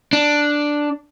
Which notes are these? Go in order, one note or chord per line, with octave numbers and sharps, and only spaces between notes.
D4